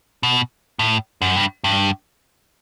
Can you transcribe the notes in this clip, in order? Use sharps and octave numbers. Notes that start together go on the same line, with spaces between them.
B2
A2
F#2
G2
G2